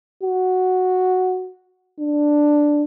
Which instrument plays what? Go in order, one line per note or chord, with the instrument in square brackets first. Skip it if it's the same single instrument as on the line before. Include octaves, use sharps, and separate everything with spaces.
[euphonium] F#4
D4